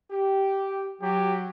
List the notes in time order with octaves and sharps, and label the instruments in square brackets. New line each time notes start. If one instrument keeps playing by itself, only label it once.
[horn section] G4
[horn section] F#3 [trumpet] G4